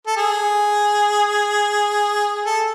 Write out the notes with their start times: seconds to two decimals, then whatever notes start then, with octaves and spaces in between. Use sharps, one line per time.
0.07 A4
0.17 G#4
2.46 A4